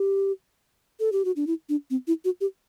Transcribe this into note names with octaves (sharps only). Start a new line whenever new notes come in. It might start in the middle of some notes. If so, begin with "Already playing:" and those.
Already playing: G4
A4
G4
F#4
D4
E4
D4
C4
E4
F#4
G4